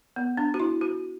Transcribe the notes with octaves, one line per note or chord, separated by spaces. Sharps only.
B3
D4
F#4
E4
F#4